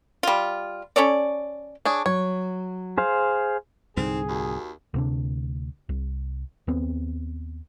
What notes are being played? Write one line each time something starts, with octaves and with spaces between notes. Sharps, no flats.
G3 F4
C#4 A4 C#5 D5
D4 G#4 C#5
F#3 C#5
G#4 C5 F5
C2 G#2 D3 C4 D#4 G#4
D#2 F#4
D2 C3 D4
C2
D#2 B3 C4